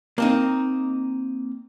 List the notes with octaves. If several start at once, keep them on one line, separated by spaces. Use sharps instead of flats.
A#3 C4 D#4